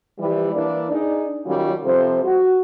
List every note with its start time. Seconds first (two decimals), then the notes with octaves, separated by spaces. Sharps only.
0.18 E3 F3 G3
0.53 E3 A#3 D4 D5
0.91 D4 D#4 G#4 D5
1.45 D#3 F#3 G3 C#4 F4
1.84 C3 F3 G3 A4 C5
2.23 F#4